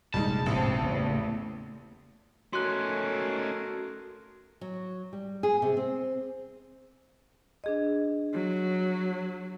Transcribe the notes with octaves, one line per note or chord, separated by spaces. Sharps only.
F1 A#1 E2 G3 G#3 D#4 A5
A1 G#3 C4
E2 A2 C#3 A#3
A3 C#4 D#4 F#4 A#4 C6 F#6
F#3
G3
G#4
C3
C4
D4 G#4 D#5
F#3